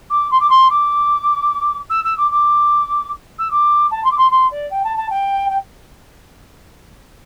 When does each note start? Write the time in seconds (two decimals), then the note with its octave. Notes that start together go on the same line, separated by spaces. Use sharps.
0.10 D6
0.31 C6
0.39 D6
0.49 C6
0.70 D6
1.89 E6
2.04 E6
2.17 D6
2.30 D6
3.38 E6
3.50 D6
3.90 A5
4.04 C6
4.10 D6
4.17 C6
4.30 C6
4.50 D5
4.70 G5
4.83 A5
4.96 A5
5.10 G5
5.49 G5